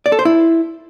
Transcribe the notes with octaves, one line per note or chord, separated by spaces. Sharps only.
D5
A4
C5
E4